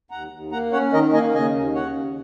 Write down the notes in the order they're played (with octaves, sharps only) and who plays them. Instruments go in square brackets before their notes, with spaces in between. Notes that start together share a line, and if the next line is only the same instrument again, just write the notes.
[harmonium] D#2 F#5 A#5
D#2
A#3 F#5 A#5
C#4 C#5 F#5
D#3 A#4 D#5
A#3 D#5 G#5
C#3 D#5 G#5
D#2
C#3 C#5 F#5
D#2